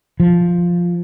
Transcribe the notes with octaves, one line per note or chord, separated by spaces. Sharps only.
F3